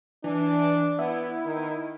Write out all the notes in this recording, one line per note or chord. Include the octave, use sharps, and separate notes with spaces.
E3 D4
B3 E4
D#3